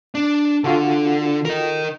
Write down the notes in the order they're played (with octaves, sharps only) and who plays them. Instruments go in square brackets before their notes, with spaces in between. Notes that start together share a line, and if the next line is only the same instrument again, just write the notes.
[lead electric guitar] D4
[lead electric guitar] D3 [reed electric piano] F4 F#4 A4
[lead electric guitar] A#4 D#5